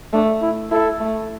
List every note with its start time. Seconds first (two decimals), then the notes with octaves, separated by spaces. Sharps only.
0.13 A3 D4
0.42 E4
0.71 E4 A4
1.00 A3